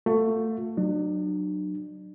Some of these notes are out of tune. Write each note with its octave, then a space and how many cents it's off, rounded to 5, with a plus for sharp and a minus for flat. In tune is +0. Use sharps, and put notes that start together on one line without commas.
A3 +20 F4 +40
F#3 +5 D4 +40